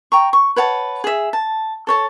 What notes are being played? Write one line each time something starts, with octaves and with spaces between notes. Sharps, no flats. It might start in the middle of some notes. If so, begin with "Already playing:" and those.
G5 A#5 C#6
C#6
B4 C#5 F#5 A5
G#4 E5
A5
A4 C#5 A5